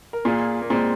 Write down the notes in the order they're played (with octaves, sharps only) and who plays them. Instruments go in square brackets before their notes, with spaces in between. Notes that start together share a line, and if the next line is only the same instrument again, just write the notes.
[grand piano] A#4
[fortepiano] A#2 [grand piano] F4 G#4
[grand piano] A#3
[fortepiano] A#2 [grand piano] G#3 C4